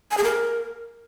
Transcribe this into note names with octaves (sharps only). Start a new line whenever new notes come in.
G#5
G#4
A#4